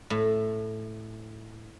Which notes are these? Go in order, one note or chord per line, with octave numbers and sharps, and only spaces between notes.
A2